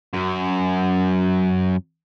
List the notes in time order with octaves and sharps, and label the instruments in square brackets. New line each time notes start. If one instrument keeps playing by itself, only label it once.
[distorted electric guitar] F#2